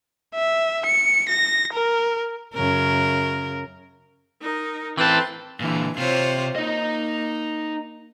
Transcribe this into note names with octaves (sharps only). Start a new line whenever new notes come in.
E5
C#7
A#6
A#4
F#2 C#3 A#4
D#4 A#4
E3 C4 A4 B4 C6
A#2 D3 E3
C3 F4 C5 C#5
A#3 D#4 D#5